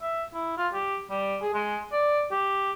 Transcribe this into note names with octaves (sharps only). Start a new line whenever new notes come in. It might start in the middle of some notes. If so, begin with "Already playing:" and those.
E5
E4
F4
G4
G3
G#4
G#3
D5
G4